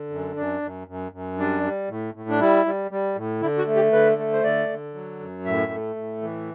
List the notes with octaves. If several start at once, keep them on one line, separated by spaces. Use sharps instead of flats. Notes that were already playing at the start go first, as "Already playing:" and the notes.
Already playing: D3
F#2
F#2 D4
F#2
F#2
F#2
G3 D4
G3
A2
A2
D4
G3 E4
G3
G3
A2
D3 E4
F#4
A3
G4
D3 B4
A3
C5
D3 D5
D3
F#3
F#2
A2 E5
A3
A2
E3